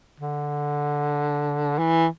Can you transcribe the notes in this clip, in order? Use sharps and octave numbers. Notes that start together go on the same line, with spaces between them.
D3
E3